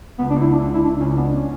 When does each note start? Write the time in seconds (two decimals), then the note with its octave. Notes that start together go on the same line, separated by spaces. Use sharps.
0.19 C#2 B3
0.31 D4
0.36 C#2 E4
0.52 C#3 D4
0.63 D4
0.68 C#2
0.74 E4
0.84 C#2 D4
1.00 C#2 C#4
1.17 B3 D4
1.34 C#4